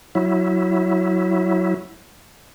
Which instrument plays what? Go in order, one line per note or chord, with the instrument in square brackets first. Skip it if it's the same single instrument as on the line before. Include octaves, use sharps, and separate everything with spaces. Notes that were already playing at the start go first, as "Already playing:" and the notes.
[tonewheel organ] F#3 E4